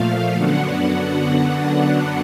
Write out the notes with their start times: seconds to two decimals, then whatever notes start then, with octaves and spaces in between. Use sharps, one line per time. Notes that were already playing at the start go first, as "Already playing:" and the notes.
Already playing: A#2 F3 A3 F5
0.34 F#2 D3 F#3 B3 D4 F#5